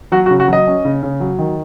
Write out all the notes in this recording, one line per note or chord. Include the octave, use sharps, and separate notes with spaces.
F#3 F#4
F#4
C#3
F#4
F#3 D#5
C#4
C#3
C#3
F#3
D#3